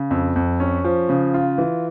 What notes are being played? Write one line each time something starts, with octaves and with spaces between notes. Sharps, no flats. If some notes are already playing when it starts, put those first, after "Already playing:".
Already playing: C#3
F2
F2
C#4
F3
C#3
F4
E3